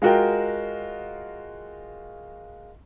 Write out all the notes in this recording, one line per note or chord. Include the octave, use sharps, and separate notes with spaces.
G#3 F4 F#4 A#4 G5